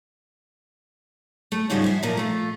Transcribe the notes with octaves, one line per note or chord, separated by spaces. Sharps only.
A3
G#2 C#3 F3 G3 F#4
G3 C5 E5
A#2 F3 A#3
A3 F4